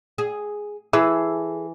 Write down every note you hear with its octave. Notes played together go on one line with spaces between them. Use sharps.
G#4
E3 G#4 A4